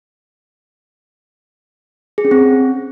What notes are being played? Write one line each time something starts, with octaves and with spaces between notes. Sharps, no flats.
G#4
C#4
C4